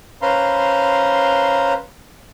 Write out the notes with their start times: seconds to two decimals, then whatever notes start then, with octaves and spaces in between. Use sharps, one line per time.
0.22 C#4 B4 C5 F5 A#5 C6